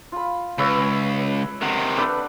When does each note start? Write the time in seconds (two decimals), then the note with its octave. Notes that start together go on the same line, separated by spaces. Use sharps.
0.12 F4 B5
0.58 C#2 B4 C#5 E5
1.62 C3 D#3 F#5
1.97 A3 D4 B4